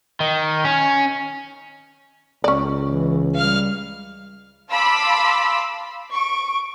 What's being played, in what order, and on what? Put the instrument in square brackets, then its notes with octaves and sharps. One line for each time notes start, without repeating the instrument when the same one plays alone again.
[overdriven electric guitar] D#3
C#4
[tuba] C#2 [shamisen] C#4 D5
[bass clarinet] E3
[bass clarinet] G3 [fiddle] F5 F6
[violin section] F5 A5 B5 C6 D6 E6
C#6 D7